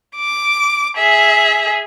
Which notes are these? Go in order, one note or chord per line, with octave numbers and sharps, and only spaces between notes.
D6
G#4 E5